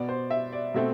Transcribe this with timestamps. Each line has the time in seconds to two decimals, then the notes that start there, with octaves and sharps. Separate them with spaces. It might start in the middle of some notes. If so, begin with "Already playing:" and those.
Already playing: B2 B3 D5
0.09 C5
0.31 E5
0.52 D5
0.74 B2 A3 C4 E5